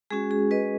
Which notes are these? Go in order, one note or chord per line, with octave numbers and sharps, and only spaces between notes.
G#3 C#4 F#4 G#4
G#4
B4 D#5